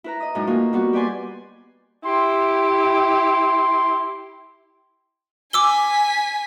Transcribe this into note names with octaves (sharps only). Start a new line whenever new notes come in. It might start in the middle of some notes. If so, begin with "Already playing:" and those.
E4 B4 A#5
D#5 D#6
F#2 A2 G#3 D#4
A#3 D#4 F4 F#4
G3 B3 F#4
G4 B4 D5 G#5 C6
E4 G4 C6
G#5 D6 E6 B6 G7